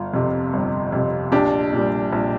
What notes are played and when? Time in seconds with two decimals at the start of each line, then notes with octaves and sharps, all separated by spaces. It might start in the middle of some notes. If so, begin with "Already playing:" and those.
Already playing: G1 F4
0.14 F2 C3
0.53 G1
0.92 F2 C3
1.32 A#1 D4 G4
1.73 A#2 G3
2.13 A#1